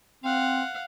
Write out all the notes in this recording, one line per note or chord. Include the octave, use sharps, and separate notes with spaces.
C4 F5 F#5